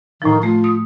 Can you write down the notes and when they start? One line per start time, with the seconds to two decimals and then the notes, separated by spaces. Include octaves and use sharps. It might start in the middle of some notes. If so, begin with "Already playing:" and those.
0.22 A2 D#3 F3
0.43 A3 F4
0.64 D#6